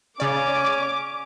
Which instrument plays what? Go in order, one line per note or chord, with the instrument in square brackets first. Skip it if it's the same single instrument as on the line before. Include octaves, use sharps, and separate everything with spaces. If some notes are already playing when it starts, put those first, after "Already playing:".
[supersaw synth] C#3 D5 [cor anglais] C#4 [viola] D6